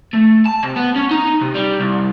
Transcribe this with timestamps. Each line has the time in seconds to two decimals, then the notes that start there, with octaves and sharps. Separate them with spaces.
0.14 A3
0.46 A5
0.63 C3
0.76 B3
0.96 C#4
1.11 D#4
1.42 C3
1.55 G3
1.80 C2